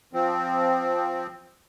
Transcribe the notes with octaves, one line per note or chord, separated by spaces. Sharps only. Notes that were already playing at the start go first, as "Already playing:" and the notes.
F3 C4